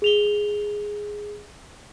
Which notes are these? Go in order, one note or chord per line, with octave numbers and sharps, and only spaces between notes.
G#4 F7 G7